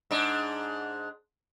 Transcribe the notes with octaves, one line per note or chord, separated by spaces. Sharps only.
G#2 D4